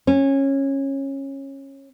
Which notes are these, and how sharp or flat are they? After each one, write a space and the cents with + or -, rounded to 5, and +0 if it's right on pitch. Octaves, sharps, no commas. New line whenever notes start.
C#4 -20